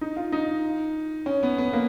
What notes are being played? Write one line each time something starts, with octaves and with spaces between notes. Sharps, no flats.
D#4
F4
D#4
C#4
B3
B3
A#3